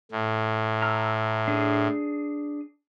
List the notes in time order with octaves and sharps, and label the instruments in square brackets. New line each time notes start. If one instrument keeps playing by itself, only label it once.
[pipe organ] A2
[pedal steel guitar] A#5 E6 F6
D4 G#4